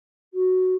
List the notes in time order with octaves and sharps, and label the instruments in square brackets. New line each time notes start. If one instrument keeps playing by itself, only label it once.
[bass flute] F#4